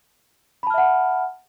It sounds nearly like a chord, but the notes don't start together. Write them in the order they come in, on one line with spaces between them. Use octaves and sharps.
B5 A5 F6 E5 F#5